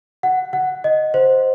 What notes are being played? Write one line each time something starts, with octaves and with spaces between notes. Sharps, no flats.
F#5
F#5
D#5
C5